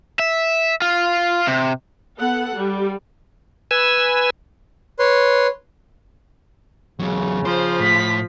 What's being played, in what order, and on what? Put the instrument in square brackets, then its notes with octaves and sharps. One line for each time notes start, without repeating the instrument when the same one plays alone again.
[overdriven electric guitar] E5
F4
C3
[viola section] B3 A4 F#5
G3
[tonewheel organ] B4 G#5 E6
[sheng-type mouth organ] B4 C#5 C6
[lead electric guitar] E2 F#3 [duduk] C#3
[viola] F3 [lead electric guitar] C5
[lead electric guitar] A2 [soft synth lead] B6